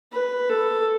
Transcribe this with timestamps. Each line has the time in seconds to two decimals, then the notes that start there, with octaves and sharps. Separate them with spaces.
0.12 B4
0.49 A4